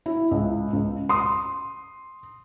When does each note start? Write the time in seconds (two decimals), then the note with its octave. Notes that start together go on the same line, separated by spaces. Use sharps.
0.06 E4
0.31 C#2
0.73 C#2
1.09 C6 D#6